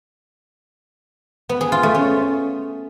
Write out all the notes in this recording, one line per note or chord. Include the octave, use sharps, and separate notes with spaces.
B3
G#4
F4
A3
C#4